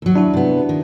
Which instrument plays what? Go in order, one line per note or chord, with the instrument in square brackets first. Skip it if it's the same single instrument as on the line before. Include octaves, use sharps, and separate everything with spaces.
[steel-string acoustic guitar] D#2 F#3
[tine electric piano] D4 E4 F#4
[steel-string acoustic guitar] C3 B3
D#3